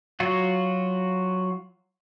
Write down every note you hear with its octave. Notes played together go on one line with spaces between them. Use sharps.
F#3 F4 F#4